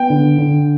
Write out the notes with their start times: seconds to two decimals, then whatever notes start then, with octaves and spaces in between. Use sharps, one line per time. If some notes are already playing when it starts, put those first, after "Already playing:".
Already playing: B3 G5
0.10 D3
0.38 D3